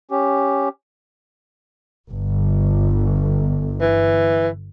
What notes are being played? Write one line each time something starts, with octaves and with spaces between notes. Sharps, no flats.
C#4 G4
G1
E3